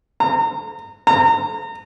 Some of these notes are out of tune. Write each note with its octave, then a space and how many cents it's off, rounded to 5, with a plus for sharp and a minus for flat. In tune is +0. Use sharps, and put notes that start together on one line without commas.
A#5 -30
A#5 -30